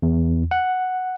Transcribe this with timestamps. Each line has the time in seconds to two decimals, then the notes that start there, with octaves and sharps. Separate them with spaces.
0.02 E2
0.51 F#5